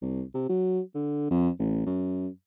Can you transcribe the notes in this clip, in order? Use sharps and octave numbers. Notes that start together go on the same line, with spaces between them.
C2
C3
F#3
D3
F2
A1
F#2